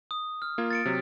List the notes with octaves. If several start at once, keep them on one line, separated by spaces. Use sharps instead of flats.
D#6
F6
A#3 F4 G#6
A6 C#7 D7
C3 F#3